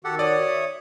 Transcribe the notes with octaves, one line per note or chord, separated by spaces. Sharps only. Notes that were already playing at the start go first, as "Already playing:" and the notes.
D#3 F#4 G4 A4 F#5
C#5 D5 D#6
E5